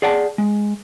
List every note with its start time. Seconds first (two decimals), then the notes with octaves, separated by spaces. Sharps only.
0.02 G#4 D5 F#5 G5 A5
0.38 G#3